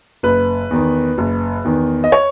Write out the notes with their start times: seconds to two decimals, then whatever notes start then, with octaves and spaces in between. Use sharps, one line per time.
0.23 F#1 B4
0.71 E2 D#3
1.18 F#1
1.65 E2 D#3
2.04 D#5
2.12 C#5